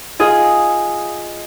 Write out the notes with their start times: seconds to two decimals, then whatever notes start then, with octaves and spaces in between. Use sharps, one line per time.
0.20 F4 G#4 D#5